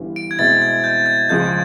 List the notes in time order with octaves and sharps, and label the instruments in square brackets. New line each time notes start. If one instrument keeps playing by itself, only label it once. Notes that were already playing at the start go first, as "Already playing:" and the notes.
Already playing: [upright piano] G1 G2 E3
[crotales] D7
G#6
[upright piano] B2 G#3 C4 E4 [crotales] A6
[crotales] G#6
G6
G#6
[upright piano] C#2 C#3 F3 G#3 [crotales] G6